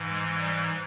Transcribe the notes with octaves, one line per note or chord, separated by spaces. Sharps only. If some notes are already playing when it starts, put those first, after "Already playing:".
Already playing: G#2 E3
G#3
G3